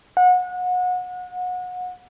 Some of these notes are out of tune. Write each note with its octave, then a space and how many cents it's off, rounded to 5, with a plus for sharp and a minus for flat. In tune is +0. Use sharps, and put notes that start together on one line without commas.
F#5 -30